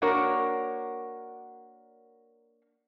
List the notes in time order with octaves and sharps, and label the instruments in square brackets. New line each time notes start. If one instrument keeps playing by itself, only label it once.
[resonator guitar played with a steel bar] A#3 D4 F#4 A#4 C#5